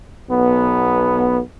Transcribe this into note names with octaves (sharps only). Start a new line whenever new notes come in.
B1 B3